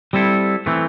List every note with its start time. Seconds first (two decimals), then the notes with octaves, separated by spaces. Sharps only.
0.13 G3 C4 E4 A4
0.66 E3 A3 C4